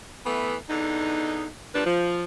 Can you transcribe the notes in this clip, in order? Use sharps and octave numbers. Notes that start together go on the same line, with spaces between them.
E3 A3 B3
E2 D3 D#4
F3 G3 A#3 D4 B4
F3